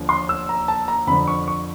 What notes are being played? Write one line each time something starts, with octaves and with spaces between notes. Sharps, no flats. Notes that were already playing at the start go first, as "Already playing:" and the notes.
Already playing: D#2 D3 F3
C6
E6
A#5
A5
A#5
F2 D3 F3 B5
C#6
C#6